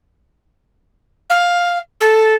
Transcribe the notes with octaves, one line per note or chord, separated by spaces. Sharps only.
F5
A4